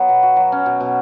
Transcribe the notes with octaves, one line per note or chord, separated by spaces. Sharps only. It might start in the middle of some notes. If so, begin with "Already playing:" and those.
Already playing: F#3 B3
B2
F#4
F#3
C#4
B2
B2